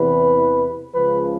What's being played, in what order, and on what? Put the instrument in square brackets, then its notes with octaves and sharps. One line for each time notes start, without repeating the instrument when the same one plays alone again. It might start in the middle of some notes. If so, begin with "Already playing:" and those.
Already playing: [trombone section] E2 C3 E3 B4
C#2 C#3 F3 B4